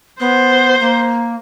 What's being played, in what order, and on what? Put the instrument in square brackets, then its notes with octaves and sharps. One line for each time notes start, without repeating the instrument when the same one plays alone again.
[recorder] B3 [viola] C5
[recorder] A#3